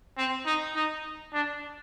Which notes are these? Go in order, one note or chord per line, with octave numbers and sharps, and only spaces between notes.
C4
D#4
D#4
D4